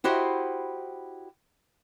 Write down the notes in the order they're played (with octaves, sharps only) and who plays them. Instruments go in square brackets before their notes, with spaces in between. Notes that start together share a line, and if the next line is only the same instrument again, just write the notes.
[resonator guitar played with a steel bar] E4 F#4 G4 C5 D#5